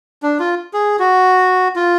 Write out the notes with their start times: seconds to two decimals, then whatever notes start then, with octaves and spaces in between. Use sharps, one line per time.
0.23 D4
0.39 F4
0.73 G#4
0.99 F#4
1.76 F4